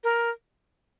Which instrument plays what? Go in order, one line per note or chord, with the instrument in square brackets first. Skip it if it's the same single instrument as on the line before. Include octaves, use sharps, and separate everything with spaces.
[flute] A#4